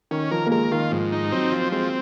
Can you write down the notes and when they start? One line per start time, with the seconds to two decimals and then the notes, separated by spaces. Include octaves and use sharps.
0.11 D#3 C#4
0.31 F3 A#4
0.46 A#3
0.51 G#3 A#4
0.72 D#3 F4
0.91 G#2 F3
1.12 D#4
1.32 F#3 C4
1.52 F3
1.72 G#3 C4